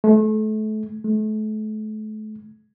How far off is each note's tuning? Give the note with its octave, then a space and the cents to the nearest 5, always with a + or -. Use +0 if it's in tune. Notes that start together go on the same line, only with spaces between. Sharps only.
A3 -30
A3 -35